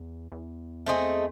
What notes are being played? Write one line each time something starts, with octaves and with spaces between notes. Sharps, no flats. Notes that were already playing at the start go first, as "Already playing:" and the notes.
Already playing: E2
E2
A3 C4 D#4 G#4